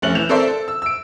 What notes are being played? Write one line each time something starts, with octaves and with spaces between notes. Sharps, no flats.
F1 A3 C#4 F#6 F#7
E3 G6 E7 F7
C4 A4 A#4 C5 D5 E5
A4
E6
E6 D7